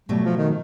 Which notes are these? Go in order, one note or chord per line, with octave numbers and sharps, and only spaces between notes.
B2 F#3 G3 A3
F3
D#3